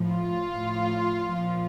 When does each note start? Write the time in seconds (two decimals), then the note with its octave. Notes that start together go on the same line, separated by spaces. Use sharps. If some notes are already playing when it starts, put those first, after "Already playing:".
Already playing: A2 F3
0.10 F4
0.49 A2 F3
1.26 A#2 F3